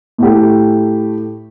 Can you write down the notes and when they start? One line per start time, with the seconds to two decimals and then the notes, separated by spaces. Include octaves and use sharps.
0.18 A2 A3 G4